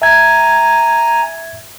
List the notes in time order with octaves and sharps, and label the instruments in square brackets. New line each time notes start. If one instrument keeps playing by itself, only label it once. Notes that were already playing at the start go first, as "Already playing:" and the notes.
[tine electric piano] E5 G#6 [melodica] G#5 A#5